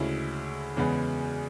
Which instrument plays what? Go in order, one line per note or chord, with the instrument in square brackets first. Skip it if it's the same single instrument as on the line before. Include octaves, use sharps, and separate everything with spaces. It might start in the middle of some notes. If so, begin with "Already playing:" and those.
Already playing: [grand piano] D2 C#3 G#3 C#4 E4
E2 C#3 G#3 B3